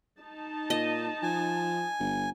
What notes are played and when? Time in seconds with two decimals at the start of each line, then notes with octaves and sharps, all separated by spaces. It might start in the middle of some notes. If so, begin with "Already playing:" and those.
0.18 D#4 A5
0.70 A#2 D#5
1.23 F3 G#5
1.99 G1